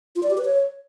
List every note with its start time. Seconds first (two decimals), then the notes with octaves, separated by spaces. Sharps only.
0.16 F4
0.23 D5
0.30 G4
0.38 B4
0.45 C#5